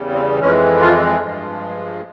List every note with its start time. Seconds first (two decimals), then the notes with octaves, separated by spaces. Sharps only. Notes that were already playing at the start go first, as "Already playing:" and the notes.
Already playing: E2 C#3 G3
0.13 C4
0.39 F2 E3 G#3 C#4
0.80 F3 F4
1.21 G2 F3 G#3